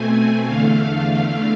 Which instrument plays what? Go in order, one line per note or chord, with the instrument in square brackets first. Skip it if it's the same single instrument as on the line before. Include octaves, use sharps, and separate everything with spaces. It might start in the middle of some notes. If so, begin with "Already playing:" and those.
Already playing: [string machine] B2 A3 C4 G#5
E2 D3 A3 F5